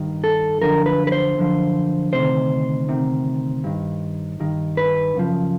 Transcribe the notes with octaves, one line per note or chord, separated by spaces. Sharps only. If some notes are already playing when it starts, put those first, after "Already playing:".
Already playing: G2 D#3
A4
F#2 D3 F3 A#4
B4
B4
C5
F#2 D3 F3
D2 C3 D#3 C5
D2 C3 D#3
G2 D#3
G2 D#3
B4
F#2 C#3 F3